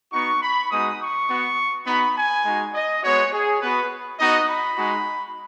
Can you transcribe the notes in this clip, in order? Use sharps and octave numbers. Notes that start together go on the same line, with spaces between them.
B3 D#4 F#4 C#6
B5
G#3 B3 D#4 F#4 D#6
C#6
B3 F#4
B3 D#4 F#4 B5
G#5
G#3 D#4 F#4
D#5
G#3 B3 F#4 C#5
G#4
B3 F#4 B4
B3 D#4 F#4 D#5
B5
G#3 D#4 F#4